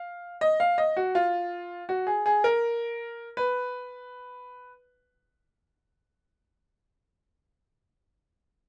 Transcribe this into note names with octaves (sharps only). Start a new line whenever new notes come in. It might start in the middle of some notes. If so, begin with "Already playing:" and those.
Already playing: F5
D#5
F5
D#5
F#4
F4
F#4
G#4
G#4
A#4
B4